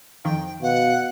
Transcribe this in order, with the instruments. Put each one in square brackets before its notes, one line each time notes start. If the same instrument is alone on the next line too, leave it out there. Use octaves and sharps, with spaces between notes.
[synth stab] F2 D#3 [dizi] G5
[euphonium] B2 [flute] F5 [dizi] F#5